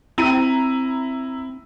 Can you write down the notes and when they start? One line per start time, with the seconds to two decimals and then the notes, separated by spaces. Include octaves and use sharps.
0.18 C4 E4 A#5 D#7